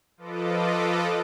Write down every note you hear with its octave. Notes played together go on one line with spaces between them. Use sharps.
F3 F4 A4 B4 D#5 D6